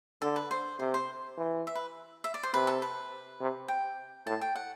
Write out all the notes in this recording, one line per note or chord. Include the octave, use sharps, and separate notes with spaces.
D3 A4
B4
C5
C3 C5
C5
E3
E5
B4
E5
D5
C5
C3 B4
A4
B4
C3
G5
A2 A5
G5
F#5